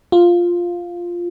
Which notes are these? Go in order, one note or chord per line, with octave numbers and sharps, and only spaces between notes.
F4